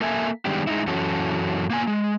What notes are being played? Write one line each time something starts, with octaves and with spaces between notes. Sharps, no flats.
A#3 A4 E5 G#5
D#3 G3 G#3 B3 D4 G4
G#3 D#4 E4
F#2 E3 C#4 F#4 A4
A#3 B3 G#5
G#3